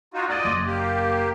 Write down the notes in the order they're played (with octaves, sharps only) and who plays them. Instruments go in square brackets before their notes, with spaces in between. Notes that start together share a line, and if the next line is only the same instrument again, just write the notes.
[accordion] D#4 F4 F#4
[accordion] D5 D#5 [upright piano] F#6 G#6 A6
[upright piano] F#1 C6 D6
[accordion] A#3 G4